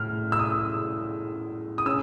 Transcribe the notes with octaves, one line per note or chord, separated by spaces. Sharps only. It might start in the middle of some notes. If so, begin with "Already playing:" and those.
Already playing: A2 F6
E6
D#6
D#6
C#4 E6